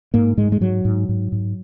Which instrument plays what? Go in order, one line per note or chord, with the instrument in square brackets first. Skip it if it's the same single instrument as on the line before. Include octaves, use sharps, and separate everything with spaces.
[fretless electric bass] G#2 A#3
G#2 G#3
G#3
G#2 F#3
G#2
G#2
G#2